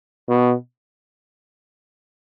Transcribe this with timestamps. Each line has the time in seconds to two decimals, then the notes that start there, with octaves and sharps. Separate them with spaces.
0.29 B2